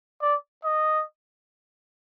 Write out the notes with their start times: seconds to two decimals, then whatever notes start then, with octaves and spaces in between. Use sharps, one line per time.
0.22 D5
0.64 D#5